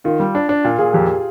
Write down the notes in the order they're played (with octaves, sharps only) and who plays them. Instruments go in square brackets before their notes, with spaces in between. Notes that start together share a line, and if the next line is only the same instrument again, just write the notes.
[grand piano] D#3 [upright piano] F4
[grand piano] G3
D4
D4
[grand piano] A#2 [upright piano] F4
[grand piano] A#2 [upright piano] G#4
[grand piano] F2 [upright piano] G4